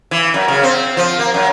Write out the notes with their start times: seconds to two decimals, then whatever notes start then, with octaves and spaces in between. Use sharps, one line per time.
0.11 E3
0.34 F#2
0.48 C#3
0.63 C4
0.97 F3
1.19 A#3
1.34 F#2